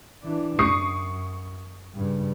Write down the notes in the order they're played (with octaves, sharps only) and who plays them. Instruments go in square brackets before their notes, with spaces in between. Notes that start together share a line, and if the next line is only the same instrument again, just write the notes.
[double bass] E3 D4
[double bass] F#2 [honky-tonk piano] C#6 D#6 C7
[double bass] G2 C#3